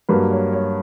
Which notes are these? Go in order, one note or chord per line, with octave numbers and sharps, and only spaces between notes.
G2 F#3 A#3 B4
C#5
C#5